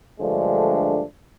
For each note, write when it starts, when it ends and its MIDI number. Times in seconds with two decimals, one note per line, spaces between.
0.20 1.02 43
0.20 1.02 50
0.20 1.02 53
0.20 1.02 56
0.20 1.02 57
0.20 1.02 62